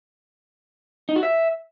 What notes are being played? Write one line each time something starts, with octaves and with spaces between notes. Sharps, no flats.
D#4
F#4
E5